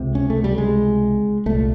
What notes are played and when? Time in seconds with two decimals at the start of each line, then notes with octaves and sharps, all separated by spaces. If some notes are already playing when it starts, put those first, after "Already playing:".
Already playing: C#2 C3
0.15 C#4
0.30 A3
0.44 G3
0.58 G#3
1.46 C2 A#2 A3